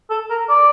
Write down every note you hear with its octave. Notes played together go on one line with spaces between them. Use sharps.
A4
A#4
D5